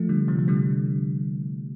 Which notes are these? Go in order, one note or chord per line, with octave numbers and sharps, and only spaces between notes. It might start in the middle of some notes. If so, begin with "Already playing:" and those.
Already playing: F3 A3
D3 G3
C3 F3
F3
D3 G3